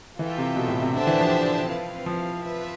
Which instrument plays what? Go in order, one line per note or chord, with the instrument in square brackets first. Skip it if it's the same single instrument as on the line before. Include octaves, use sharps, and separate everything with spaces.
[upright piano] E3 [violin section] F4 A4 E5 G5
[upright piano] C3
B2
A2
C3
[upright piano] D3 [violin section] D4 G4 C5 E5 A5
[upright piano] E3
F3
[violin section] C4 E4 B4 F5
[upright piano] F3
[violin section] F4 B4 E5